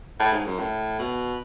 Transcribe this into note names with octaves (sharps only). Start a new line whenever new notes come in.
A2
G#2
F#2
A2
B2